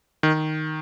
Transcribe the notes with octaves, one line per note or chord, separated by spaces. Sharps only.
D#3